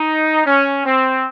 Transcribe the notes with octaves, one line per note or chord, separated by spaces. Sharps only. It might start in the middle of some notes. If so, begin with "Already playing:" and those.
Already playing: D#4
C#4
C4